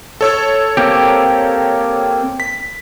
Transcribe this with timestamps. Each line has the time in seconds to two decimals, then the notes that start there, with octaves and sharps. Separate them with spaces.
0.21 A4 C#5 E6
0.77 A#3 C4 G4
2.40 B6